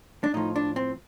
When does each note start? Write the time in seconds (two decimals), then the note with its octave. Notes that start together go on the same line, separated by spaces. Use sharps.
0.24 D4
0.34 A2 F3 D#4
0.56 D4
0.76 C4